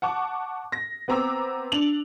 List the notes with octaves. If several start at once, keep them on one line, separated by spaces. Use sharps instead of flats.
F#5 A5 C#6 D6
A#6
B3 C4 A#5 D6 E6
D4 F7 F#7